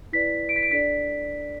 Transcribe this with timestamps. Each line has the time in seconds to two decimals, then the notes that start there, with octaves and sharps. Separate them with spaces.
0.13 E4 B4 D5 B6
0.49 D7
0.56 B6
0.63 D7
0.71 D4 A4 D5 B6